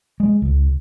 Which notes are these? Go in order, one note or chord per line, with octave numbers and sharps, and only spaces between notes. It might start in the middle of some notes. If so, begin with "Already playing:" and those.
G#3
C#2